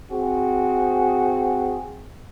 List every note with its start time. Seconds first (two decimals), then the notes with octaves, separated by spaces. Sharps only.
0.12 C4 F#4 G#4